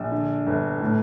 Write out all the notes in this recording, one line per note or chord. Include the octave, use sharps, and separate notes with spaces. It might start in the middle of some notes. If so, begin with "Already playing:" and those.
Already playing: A#1
D3
G1
A2